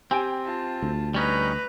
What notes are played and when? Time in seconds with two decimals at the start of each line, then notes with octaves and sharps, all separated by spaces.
0.11 C4 G4 G#5 D7
0.45 F4 A5
0.82 D2
1.14 G3 C#4 D#4 B4 A#5